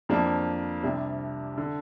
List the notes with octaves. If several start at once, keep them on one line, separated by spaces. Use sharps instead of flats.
F2 F3 A#3 D4
C2 C3 G3 D4
D3